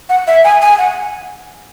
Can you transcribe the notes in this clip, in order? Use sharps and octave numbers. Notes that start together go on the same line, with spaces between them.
F#5
E5
G#5
G#5
F#5